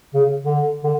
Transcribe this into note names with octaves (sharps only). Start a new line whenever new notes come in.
C#3
D3
D3